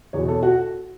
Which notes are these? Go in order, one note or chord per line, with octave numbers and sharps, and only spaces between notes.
E2 B2 C#5
A4
F#4